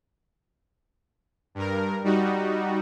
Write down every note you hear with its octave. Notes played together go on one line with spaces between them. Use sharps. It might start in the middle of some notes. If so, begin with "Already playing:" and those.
G2 A#4
G3 D#4 F#4